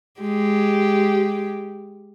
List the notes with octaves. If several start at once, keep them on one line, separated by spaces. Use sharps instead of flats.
G#3 G4